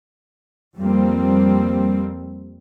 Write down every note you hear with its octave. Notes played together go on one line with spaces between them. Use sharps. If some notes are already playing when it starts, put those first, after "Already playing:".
F2 G3 A#3 C4